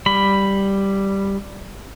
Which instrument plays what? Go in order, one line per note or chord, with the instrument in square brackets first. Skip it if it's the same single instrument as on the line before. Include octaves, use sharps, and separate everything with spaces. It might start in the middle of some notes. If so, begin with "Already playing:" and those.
[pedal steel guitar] G3 B5